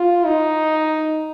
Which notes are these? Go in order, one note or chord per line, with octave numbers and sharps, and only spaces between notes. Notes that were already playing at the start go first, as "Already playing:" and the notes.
Already playing: F4
D#4